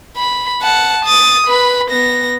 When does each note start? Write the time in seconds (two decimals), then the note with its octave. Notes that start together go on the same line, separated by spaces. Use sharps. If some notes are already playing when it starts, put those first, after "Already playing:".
0.17 B5
0.62 F#5 A5
1.05 D#6 A6
1.47 B4 B5
1.91 B3 A#6